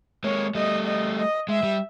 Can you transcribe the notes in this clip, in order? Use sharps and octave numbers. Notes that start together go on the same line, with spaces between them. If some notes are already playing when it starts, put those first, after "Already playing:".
G#3 A#3 C#5
G3 A3 D#5
D#5
D#5
G#3 E5
G3